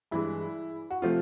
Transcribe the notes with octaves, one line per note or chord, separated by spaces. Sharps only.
G2 E3 G#3 E4
F#4
C3 F3 A3 F4